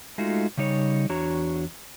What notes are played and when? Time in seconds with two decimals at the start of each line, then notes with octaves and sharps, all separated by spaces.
0.18 G#3 A3 D#4 F4 F#4
0.57 C#3 G3 D#4 C#5
1.09 E2 D4 F#4 C#5 A#5